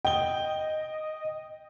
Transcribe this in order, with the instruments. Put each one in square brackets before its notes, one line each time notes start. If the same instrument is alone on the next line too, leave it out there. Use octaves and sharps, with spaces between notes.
[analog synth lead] D#5 [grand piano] G5 G7